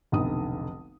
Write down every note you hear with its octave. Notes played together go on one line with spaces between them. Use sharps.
F1 B1 D3 D#4 D#6